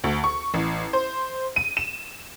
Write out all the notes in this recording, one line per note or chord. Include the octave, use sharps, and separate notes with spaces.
D2
C#6
A1
C5
D#7
E7